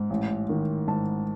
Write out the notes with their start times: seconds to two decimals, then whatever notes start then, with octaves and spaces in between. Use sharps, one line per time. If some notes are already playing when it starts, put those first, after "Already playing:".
Already playing: G#2
0.10 A1
0.49 D#3
0.88 G#2 A5